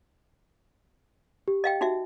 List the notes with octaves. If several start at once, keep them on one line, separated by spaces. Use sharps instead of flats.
G4
D#5 F5 G5
D#4 F#4 E5